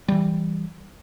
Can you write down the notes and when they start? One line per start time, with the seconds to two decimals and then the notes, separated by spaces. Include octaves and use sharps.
0.08 E3 G3